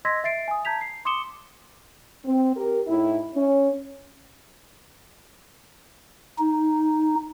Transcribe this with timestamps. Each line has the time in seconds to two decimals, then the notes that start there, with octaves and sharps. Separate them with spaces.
0.05 D#5 C6 E6 G#6 A#6 B6
0.24 E5 A6 C7 D7
0.48 G#5 D#6
0.65 A5 A#5 G6 G#6 B6 F7
0.81 C7
1.05 C6 D6 D#6 C#7 E7 G7
2.25 C4
2.56 G4 A#4
2.88 A2 D#4 E4
3.36 C#4
6.38 D#4